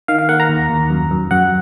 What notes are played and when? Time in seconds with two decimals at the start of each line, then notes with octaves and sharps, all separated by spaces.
0.08 D#3 F5
0.19 F5
0.29 A#3 F#5
0.40 A#5
0.49 D#2
0.70 D#2
0.91 F#2
1.11 F#2
1.31 F#2 F#5